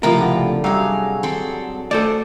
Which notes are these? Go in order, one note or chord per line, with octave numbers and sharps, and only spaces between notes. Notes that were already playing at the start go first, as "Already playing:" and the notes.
C#2 A2 C3 F3 F4 A#4
D3 G4
C3 F#3 G3 G#4 F5
C4 A4
A3 A4 C5 D5